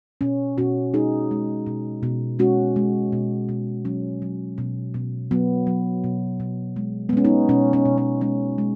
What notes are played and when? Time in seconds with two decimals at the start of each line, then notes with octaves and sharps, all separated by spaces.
0.21 B2 C#4
0.58 B2 C#4 F#4
0.94 G#3 D#4 G#4
1.31 G#3
1.66 B2
2.03 B2
2.39 G#3 C#4 F#4
2.76 G#3
3.12 B2
3.49 B2
3.85 F#3 C#4
4.22 F#3
4.58 B2
4.94 B2
5.31 F#3 B3
5.67 F#3
6.04 B2
6.40 B2
6.76 G#3
7.09 B3
7.13 G#3 C#4
7.25 B3 D#4
7.49 B2 C#4
7.73 C#4
7.85 B2
7.98 C#4
8.21 G#3 C#4
8.58 G#3